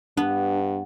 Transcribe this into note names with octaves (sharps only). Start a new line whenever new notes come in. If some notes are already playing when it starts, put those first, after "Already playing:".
G2 B3 D4